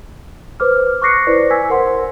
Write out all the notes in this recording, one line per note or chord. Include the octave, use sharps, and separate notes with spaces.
B4 C5 D6 F6
C#6 D6 F#6 A#6 C7 C#7
E4 B4 C5 D5
G#5 E6 G#6 B6
A#4 C5 F#5 C6